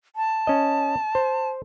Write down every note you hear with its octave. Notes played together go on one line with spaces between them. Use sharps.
A5
C#4 D#5
C5